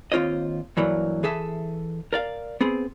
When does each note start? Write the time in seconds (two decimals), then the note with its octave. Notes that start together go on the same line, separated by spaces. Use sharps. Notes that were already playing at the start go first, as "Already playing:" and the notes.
0.12 D#2 C4 F4 C#5 D#5
0.77 G2 E3 F#3 A#3
1.23 E3 G#4 A4 E5
2.13 A#4 D5 F5
2.61 B3 C4 G#4